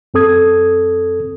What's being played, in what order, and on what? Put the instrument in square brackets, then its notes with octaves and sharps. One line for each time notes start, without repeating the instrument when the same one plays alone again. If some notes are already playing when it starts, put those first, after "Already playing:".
[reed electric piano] F#2 C4 A4 D#6 G#6